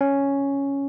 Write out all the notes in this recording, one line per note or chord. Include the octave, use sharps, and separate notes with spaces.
C#4